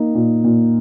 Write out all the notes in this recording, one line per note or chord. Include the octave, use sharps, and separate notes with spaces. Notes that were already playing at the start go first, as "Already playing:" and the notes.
Already playing: A#3 D#4
A#2
A#2